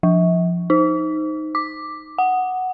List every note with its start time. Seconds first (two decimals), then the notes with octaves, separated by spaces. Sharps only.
0.03 F3
0.70 D#4
1.55 D6
2.18 F#5